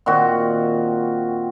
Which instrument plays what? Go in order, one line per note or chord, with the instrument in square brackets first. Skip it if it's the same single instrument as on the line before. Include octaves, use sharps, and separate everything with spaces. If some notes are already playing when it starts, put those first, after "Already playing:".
[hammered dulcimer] A#2 D#3 C4 F#4